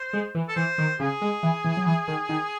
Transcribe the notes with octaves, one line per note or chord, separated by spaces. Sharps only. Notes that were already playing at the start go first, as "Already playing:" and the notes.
Already playing: C5
G#3
E3
A4
E3 C5
D#3
C#3 G#4
G#3
E3
E3
F#3
E3
D#3
D#3